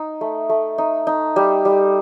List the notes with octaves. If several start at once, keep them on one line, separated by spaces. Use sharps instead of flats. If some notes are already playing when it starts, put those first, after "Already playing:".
Already playing: D#4
A3
A3
D#4
D#4
G3
G3